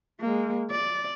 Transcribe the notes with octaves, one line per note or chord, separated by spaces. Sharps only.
G#3 A#3
D5